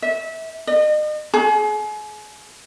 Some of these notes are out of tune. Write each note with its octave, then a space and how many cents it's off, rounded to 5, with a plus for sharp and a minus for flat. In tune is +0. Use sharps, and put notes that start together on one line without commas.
E5 -25
D#5 -40
G#4 +35